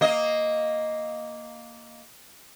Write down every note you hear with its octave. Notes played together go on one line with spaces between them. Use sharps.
A#3 D#5